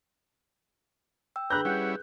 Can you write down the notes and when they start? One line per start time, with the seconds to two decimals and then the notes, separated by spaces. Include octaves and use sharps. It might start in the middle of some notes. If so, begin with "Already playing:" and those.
1.36 G5 E6
1.50 G#4 B4 A#5 B5 F#6 G6
1.65 G3 C#4 E4 F#5